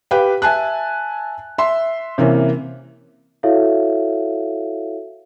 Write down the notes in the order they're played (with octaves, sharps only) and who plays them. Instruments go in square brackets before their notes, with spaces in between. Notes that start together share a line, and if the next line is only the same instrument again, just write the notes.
[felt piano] G4 B4 F5 G5
E5 G#5 A5 F#6
E5 C6
C3 E3 A#3 C#4
[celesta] E4 F#4 A4 C#5 E5 F5